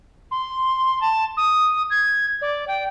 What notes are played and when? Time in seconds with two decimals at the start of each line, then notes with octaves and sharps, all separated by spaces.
0.31 C6
1.01 A5
1.37 D#6
1.90 G#6
2.41 D5
2.68 G5